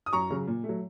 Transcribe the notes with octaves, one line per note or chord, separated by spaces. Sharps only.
D#6
F#2 A#5 C#6
C#3 F#3
A#2
A3
F#3